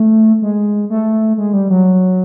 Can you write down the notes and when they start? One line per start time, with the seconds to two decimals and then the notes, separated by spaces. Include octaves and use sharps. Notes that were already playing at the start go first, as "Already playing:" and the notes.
Already playing: A3
0.42 G#3
0.90 A3
1.38 G#3
1.53 G3
1.70 F#3